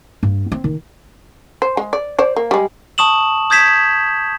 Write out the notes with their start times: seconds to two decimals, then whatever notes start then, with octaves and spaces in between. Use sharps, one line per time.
0.23 G2
0.52 C4
0.64 D#3
1.62 C5
1.77 G#3
1.93 D5
2.19 C5 D5
2.36 A#3
2.51 G3 G#3
2.98 A5 C#6 D#6 E7 F#7
3.50 D#6 G6 G#6 B6 E7